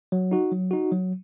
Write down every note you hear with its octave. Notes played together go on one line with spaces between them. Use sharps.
F#3
D#4 F#4
F#3
D#4 F#4
F#3